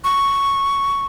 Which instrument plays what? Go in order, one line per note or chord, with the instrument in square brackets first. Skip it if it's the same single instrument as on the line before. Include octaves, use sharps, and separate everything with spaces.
[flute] C#6